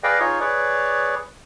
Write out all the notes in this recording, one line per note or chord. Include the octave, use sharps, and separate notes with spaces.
G#4 B4 D5 D#5 F5 G5
D#4 F4 G#4 C#5
G#4 B4 C#5 D5